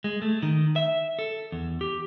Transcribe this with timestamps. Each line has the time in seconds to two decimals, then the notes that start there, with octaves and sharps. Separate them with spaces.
0.04 G#3
0.22 A3
0.43 D#3
0.76 E5
1.19 A4
1.52 E2
1.81 G4